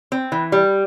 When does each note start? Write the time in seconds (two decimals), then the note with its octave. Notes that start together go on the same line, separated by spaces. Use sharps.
0.12 C4
0.32 E3
0.52 G3